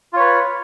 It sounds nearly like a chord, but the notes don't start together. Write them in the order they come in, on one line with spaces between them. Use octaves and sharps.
F4 C#5 B4